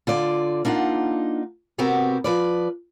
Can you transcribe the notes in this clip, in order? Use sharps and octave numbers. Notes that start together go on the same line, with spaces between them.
D3 F4 D5
A#3 D4 D#4 F4 F#5
C3 B3 C4 F#4 G4 A#4
F3 B4 D5